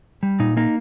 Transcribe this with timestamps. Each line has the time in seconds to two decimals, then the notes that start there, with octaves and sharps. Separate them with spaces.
0.23 G3
0.40 A#2 D#4
0.57 A#3 D#4